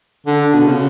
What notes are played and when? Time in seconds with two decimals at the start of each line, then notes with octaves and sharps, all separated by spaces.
0.27 D3
0.54 B2
0.65 C#3